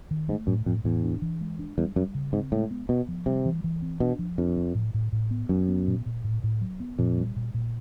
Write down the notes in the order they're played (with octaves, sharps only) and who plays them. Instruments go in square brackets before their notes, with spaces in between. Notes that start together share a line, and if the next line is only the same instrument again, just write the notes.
[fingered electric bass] D#3
[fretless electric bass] G#2 [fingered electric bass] A3
[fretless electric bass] F#2 [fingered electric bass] A2
[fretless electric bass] F2 [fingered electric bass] A2
[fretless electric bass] E2 [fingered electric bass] A2
[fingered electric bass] D4
E3
G#3
D4
[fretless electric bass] E2 [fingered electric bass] G3
[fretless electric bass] F#2 [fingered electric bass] G3
[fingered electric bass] C#3
[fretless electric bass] G#2 [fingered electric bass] C4
[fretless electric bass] A2 [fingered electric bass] G#3
[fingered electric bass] B3
[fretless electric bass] B2 [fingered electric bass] B3
[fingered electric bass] F3
[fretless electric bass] C3 [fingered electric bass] G3
[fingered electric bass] E3
E3
C4
[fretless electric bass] B2 [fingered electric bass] D4
[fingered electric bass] F3
[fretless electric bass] F2 [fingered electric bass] D4
[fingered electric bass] F3
A2
A2
A2
B3
[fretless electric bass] F#2 [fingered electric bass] F#3
[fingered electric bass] B3
A#2
A#2
A2
A2
F#3
B3
[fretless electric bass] F2 [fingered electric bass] A#2
[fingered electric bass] G3
A#2
A#2